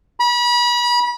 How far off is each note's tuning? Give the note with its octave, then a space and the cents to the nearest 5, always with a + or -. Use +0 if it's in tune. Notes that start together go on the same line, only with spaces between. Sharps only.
B5 -35